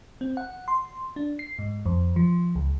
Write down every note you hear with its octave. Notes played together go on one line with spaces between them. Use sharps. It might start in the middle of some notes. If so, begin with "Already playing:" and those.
C4
F#5
C6
D4
C7
G#2
F2
F3
C#2